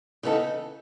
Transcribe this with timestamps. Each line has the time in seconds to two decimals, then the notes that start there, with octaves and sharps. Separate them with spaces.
0.23 C#3 E3 B3 D#4 A4